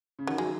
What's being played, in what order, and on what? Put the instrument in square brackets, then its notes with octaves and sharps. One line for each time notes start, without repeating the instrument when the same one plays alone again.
[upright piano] C#3
[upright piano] D#3 [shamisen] F#3
[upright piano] F#3 [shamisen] G#3